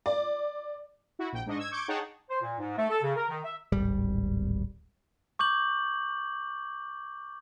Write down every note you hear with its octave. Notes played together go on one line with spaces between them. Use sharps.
D5
E4 F#4
A#1 G5
G#2 D4 D#5 C#6
E6 G#6
C#6 D6 G6 G#6 D7
D#4 G#4 C#5 F#5 G5 A5
C5
A#2
G#2
A3
A4
C#3
A#4
D#3
E5
D1 G#1 G3
C#6 D6 G6 F#7